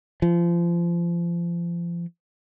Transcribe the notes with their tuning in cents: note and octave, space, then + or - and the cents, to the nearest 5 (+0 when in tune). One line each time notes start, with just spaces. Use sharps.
F3 -30